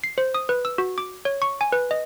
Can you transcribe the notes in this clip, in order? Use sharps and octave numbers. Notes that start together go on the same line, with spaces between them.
C7
C5
D#6
B4
E6
F#4
D6
C#5
C#6
G#5
B4
D#5